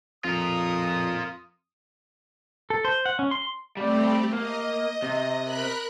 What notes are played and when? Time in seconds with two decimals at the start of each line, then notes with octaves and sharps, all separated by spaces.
0.24 F2 F4 A#4 D#6
2.70 A4
2.85 C5
3.06 F#5
3.19 C#4
3.31 C6
3.77 G3 A3 C4 G4 D5
4.33 A#3 D#5
5.02 C3
5.43 A#4 B5 F#6